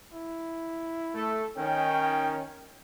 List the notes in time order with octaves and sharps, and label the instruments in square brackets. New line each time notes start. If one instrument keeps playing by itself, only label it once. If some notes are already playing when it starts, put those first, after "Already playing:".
[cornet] E4
[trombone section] A3 A4
[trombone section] D#3 C#4 [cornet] G5